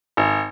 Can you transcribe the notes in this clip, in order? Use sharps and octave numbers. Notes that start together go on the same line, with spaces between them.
G#1